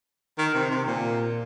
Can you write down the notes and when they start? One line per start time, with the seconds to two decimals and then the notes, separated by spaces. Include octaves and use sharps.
0.38 D#3
0.55 C3
0.71 C3
0.87 A#2